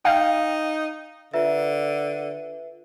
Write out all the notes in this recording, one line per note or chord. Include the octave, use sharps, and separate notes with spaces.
D#4 F5 G5
D3 F4 B4 E5